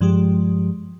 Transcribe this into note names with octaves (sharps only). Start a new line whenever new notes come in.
G2 F3 G#3 G4